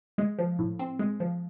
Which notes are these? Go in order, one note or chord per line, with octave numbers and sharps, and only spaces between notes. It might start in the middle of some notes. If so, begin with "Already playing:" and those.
G#3
F3
A2
C4
G#3
F3